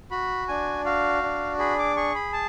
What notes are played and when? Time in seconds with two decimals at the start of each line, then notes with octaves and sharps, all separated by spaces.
0.11 F#4 B5
0.48 D4 G#5
0.85 F#4 F5
1.23 D4
1.59 G#4 B5
1.78 D6
1.96 G#4 C#6
2.15 B5
2.33 A5